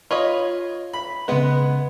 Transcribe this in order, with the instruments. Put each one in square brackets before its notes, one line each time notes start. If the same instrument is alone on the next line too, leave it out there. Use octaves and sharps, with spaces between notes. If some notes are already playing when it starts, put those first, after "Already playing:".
[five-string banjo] F4 C#5 D#5 [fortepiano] B5
[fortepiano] B5
[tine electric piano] C#3 B4 [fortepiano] G#3 B3